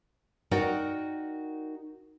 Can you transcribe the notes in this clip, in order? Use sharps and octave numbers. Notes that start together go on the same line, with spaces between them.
D#4 F#4 A#4 D5 F#5 G5